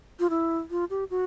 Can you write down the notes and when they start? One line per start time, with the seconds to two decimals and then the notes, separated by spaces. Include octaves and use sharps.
0.20 F4
0.30 E4
0.71 F4
0.90 G4
1.10 F#4